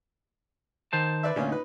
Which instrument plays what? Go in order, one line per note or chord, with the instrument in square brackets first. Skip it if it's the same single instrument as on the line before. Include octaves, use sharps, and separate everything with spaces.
[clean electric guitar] D#3 C5 A5
[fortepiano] B4 D5 E5
[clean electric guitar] D2 [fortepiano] A#2 C#4 F4
[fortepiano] D#4 B4